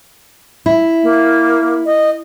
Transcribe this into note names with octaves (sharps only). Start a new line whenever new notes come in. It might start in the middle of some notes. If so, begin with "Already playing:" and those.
E4
A#3
D#5